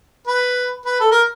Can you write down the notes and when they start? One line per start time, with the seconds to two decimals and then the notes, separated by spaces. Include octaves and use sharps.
0.27 B4
0.85 B4
1.00 A4
1.11 A#4